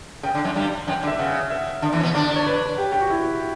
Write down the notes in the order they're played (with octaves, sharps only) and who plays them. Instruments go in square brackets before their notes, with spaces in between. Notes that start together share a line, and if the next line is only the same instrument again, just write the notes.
[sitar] C#3 [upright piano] G5
[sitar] D3
F#2 F#3
G2 G3
[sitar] F#2 F#3 [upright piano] G5
[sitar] D3
[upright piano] E5
[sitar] C#3 [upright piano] F#5
[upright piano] E5
[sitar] D3
E2 E3
C#4
B2 B3
[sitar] D3 D4 [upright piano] D5
[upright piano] C#5
B4
G4
G4
F#4
E4